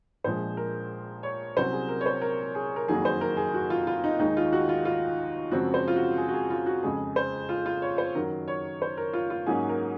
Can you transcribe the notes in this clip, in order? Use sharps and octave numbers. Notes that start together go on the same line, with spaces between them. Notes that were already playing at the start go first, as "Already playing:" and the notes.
A#1 A#2 F3 G#3 C5
A#4
C#5
C2 C3 F#3 C#4 C5
G#4
A#4
C#5
C5
A#4
G#4
A#4
F#1 F2 D#3 F#3 A#3 G#4
C5
A#4
G#4
F#4
F4
F4
D#4
D#2 D#3 G#3 D#4
F4
F#4
F4
F4
F#2 C#3 F3 G#3 C4 F#4
C5
F4
F#4
G#4
F#4
G#4
F4
F#4
F2 C#3 G#3 G#4
C5
F4
F4
C#5
C5
F#2 D#3 F#3 A#4
C#5
C5
A#4
F4
F4
G#2 F#3 A#3 C#4 G#4
A#4